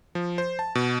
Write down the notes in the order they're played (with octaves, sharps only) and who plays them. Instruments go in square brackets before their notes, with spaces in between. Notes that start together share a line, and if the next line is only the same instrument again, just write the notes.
[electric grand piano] F3
C5
A5
B2